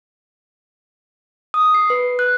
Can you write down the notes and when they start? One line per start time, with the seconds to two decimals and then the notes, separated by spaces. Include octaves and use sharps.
1.54 D#6
1.74 C7
1.90 B4
2.19 F#6